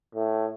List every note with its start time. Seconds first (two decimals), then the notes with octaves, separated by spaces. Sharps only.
0.15 A2